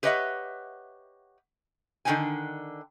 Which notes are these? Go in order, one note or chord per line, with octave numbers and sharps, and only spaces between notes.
G4 B4 C#5 D#5 E5 F#5
D3 D#3 G#3 D4 G5 G#5